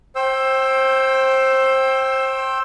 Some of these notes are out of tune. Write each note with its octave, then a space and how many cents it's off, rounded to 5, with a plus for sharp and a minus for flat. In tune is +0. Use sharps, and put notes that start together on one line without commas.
C5 +25 G5 -5 E6 +0